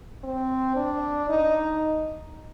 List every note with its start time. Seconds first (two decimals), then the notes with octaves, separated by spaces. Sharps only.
0.24 C4
0.76 D4
1.29 D#4